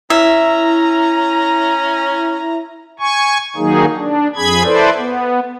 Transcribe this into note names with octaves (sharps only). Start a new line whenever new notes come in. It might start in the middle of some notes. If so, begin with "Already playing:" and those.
C#4 E4 E5 A#5
G#5 C#6
D#3 F#3 A#3 D#4 G#4
D4
F2 G#4 B5 G#6
E4 A4 B4 C5 D5
B3